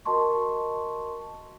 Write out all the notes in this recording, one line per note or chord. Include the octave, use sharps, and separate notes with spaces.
F#4 A#4 D#5 A5 C6 C#6